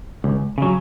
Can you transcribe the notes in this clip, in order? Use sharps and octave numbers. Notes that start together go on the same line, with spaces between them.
C#2
C#3 F#3